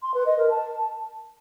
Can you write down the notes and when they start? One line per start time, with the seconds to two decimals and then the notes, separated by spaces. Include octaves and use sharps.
0.02 C6
0.14 B4
0.26 D#5
0.37 A#4
0.49 A5